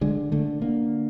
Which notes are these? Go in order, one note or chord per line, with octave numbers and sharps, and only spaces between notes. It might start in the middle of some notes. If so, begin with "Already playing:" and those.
D3 G#3
D3 A3
D3 A#3